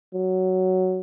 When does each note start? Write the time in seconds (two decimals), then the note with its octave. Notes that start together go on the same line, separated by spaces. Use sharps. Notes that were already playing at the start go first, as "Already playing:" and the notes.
0.15 F#3